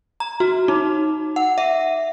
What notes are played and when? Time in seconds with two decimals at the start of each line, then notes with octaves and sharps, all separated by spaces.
0.20 A#5
0.40 F#4
0.68 D#4
1.36 F#5
1.58 E5